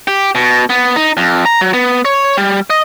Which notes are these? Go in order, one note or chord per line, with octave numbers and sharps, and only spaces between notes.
G4
B2
B3
D#4
F2
A#5
F#3
B3
C#5
G3
D#5